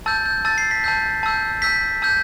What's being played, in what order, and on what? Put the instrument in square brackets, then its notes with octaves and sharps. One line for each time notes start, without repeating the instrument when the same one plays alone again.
[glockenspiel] A5 E6 G6 A6
G6
A5 E6 G6 A6
C7
B6
A5 E6 G6
A5 E6 G6
A5 E6 G6 B6
A5 E6 G6